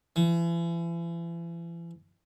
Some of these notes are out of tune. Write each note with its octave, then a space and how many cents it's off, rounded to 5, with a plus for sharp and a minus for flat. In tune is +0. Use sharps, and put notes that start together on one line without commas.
E3 +40